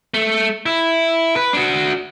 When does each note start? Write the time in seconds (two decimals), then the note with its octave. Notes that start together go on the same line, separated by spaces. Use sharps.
0.14 A3
0.66 E4
1.36 B4
1.53 D4 F#4